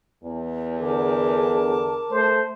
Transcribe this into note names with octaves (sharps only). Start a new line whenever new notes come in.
E2
D3 G#4 A#4 A5 D6
A3 C5